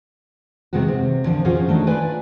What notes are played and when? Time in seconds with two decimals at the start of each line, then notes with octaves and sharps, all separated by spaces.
0.73 C3 D#3 G#3 B3 F#4
0.88 C3
1.24 A#2 D3 F3
1.45 C#4 F4 F#4 G#4 C5
1.68 D#3 A3 D4 D#4
1.87 F4 B4 D5 G#5